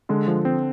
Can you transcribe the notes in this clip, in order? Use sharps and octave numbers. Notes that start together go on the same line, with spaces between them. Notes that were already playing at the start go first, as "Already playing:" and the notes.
D3 G#3
F3
C4